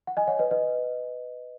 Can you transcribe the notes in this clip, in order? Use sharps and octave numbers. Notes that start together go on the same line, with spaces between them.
F#5
D#5 G#5
C#5 F#5
B4 D#5
B4 D#5